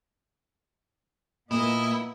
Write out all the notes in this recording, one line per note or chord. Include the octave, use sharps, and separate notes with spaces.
A#2 A#3 B3 E4 D#5